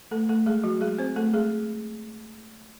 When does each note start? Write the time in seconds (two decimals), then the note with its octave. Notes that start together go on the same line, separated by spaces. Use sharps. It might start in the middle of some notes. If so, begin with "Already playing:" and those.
0.11 A3 A4
0.29 A3 A4
0.46 G#3 G#4
0.64 F#3 F#4
0.81 G#3 G#4
0.98 C4 C5
1.16 A3 A4
1.33 G#3 G#4